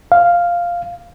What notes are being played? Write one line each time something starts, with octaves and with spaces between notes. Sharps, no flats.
F5